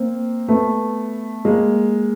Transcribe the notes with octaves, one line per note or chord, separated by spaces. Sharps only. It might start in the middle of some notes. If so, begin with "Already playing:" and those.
Already playing: A#3 C4
A3 B3
G#3 A#3